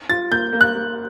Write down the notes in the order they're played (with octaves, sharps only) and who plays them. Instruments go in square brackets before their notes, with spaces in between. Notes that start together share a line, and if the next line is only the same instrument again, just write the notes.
[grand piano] F4 [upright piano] A6
[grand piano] A#3 [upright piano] G6
[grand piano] A#3
[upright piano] F#6
[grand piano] A#3